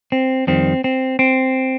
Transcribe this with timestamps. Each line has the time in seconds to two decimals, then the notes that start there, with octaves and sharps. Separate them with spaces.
0.12 C4
0.47 F2 D#3 G3 C4
0.84 C4
1.19 C4